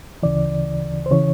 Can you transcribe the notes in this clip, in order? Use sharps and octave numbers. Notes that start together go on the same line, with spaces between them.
D2 C#3 E3 D5
C5
C#3 E3 C#5